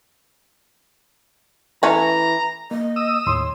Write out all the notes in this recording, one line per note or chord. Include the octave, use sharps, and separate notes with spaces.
E3 A3 C#4 A#5
A#3 D#5
D#6 E6
D#2 A2 C#5 C6